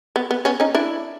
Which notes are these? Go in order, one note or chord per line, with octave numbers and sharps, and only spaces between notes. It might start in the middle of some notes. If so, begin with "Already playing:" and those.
B3
B3
B3 C#4
C#4 D#4
D4 E4